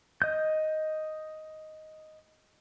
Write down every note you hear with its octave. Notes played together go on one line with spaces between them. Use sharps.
D#5 G6